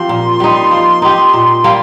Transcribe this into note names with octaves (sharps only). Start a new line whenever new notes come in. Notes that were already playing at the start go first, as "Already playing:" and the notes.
Already playing: F3 C4 G4 C6
A#2
G3 D#4
F3
D#4 G4
A#2
G3 A#3 F4